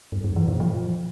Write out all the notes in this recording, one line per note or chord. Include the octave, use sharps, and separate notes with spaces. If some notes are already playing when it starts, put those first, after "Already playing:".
G2
F#2
E3
A#2
F3